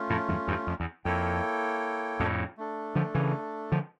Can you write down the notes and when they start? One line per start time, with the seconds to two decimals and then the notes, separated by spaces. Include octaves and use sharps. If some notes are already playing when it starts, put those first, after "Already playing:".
Already playing: A3 C#4 F4
0.10 F2 A2
0.28 E2 G2
0.48 E2 G2
0.67 F2
0.80 E2
1.05 F2 A#3 E4 A4 C#5 G5
2.20 F2 A2
2.57 A3 D4 A4
2.95 D3 F3
3.15 C#3 E3
3.72 D3 F3